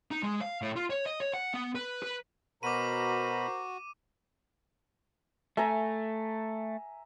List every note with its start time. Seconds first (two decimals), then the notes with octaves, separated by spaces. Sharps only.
0.11 D#4
0.23 G#3
0.41 F5
0.62 A2
0.76 F4
0.90 C#5
1.06 D#5
1.20 C#5
1.34 F#5
1.54 B3
1.75 B4
2.02 B4
2.63 B2 F#4 A#4 C5 A#5 B5 D6 D#7
5.57 A3 E5 G#5 A#5